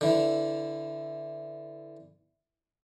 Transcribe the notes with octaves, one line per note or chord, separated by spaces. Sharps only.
D3 E3